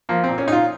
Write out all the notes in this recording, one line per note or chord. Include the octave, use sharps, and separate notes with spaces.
F3 A#3
A#2 C4
C#4
A#2 D#4 F4